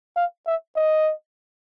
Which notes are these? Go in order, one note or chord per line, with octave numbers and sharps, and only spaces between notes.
F5
E5
D#5